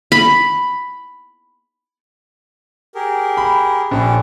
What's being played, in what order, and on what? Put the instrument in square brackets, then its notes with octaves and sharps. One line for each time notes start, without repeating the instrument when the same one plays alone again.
[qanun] B5
[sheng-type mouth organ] G4 G#4 A#4
[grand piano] B5
[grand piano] A#1 [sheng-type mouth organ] C#4 G4 A4